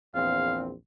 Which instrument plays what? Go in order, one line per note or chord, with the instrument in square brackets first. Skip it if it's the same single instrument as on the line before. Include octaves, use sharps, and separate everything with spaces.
[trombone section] A#1 E2 C4 [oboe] F5